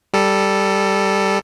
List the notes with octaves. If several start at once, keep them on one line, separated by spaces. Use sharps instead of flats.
G3 A4